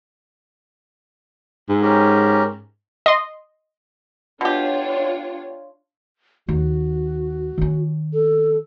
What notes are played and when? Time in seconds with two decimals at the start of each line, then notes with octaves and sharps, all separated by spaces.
1.69 G#2
1.83 C#4 G4 A#4
3.06 D#5 C6
4.41 B2 D4 F4 G4 C#5
6.48 D#2 F#4
7.58 D#3 C#4
8.13 A4